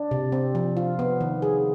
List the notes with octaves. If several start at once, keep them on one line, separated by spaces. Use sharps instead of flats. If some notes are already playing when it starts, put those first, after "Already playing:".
Already playing: D4
C3
C4
F3
F4
B3
D#3
G#4